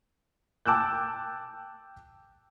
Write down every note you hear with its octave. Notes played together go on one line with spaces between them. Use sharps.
G5 A5 D6 E6 F#6 G6